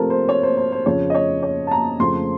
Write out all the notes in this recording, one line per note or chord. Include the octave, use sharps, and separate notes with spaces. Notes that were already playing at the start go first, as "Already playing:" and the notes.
Already playing: C3 F3 A3 A4 A#4
C5
C#5
C5
C5
C5
F2 C#3 F3 C#5
D#5
C#5
C#5
A5
A#5
F2 C#3 F3 A3 C6